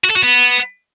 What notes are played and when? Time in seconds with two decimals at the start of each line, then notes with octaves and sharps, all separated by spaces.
0.04 F#4
0.10 A4
0.16 F#4
0.22 B3